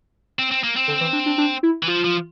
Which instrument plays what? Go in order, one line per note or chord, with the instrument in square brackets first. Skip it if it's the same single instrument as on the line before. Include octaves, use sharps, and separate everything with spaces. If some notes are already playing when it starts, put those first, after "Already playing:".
[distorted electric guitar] C4
C4
A#3
C4
[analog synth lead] D3
E3
D4
D4
D4
E4
[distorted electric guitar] E3
[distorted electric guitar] F3 [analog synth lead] F4
[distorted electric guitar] F3